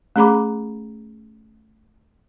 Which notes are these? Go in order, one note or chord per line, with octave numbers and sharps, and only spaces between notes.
A3 C#4 G#4 A#5 B5 D6